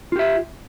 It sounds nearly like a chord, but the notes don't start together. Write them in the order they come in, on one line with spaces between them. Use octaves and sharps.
F4 G4 E5